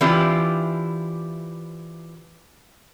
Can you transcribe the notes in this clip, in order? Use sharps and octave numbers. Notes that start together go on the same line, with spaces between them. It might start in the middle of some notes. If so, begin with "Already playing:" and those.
E3 C4 D4 E4 F4 G4